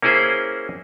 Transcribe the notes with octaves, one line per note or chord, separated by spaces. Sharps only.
A#3 C#4 E4 G#4 C5